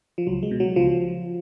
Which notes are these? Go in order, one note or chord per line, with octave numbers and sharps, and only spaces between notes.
F3
C#2 F#3
G#3
B2
F#3
C#2 F3